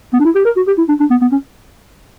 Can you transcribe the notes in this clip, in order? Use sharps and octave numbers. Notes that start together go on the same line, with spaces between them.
B3
D4
E4
G4
A#4
F#4
G4
E4
D4
D4
B3
B3
C#4